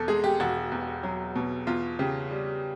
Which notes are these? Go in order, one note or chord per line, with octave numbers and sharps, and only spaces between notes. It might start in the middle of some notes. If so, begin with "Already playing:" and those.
Already playing: E2 B2 A4
G#3 G#4
G4
E1 F#4
E2
F#3
B2
E2 F4
C#3 G4
G3